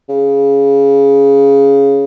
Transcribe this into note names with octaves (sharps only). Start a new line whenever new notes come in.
C#3